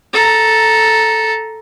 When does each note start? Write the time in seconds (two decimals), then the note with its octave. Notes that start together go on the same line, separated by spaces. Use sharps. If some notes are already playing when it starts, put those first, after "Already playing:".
0.13 A4 A#5